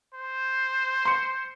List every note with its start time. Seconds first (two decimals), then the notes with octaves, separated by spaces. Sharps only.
0.15 C5
1.05 C6 C#7